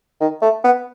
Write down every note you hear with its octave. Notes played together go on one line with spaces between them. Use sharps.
D#3
A3
B3